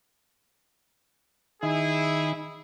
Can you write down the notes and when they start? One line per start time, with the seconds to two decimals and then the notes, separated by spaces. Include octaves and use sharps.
1.63 D#3 D#4 E4 G#4 E5